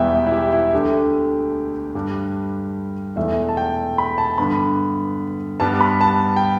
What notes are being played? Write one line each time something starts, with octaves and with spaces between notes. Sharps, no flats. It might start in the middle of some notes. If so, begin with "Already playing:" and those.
Already playing: E1 E2 E3 G3 B3 E5 G5
E4
G4
E4
D2 D3 A3 D4 G4
G2 D3 G3 D4
E1 E2 E3 A3 E5
A5
G5
B5
A5
G2 D3 B3 B5
G2 G3 B3 D4 A5
B5
A5
G5